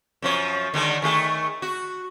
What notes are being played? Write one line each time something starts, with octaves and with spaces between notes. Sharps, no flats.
F#2 F3 C#5
D3 D#3 G#3
D#3 A3 G#4
F#4